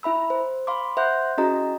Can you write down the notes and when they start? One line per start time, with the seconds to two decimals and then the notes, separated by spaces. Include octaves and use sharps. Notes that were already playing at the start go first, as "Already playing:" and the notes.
0.03 E4 E5 B5 E6
0.30 C5
0.67 F5 B5 C6 D6
0.97 C5 E5 F#5 C6 F#6 G6
1.38 C#4 E4 F#4 G#4 D#5 A#5